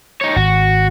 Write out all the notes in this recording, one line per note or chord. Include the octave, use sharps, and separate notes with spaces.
D#4 C#5
G#1 F#4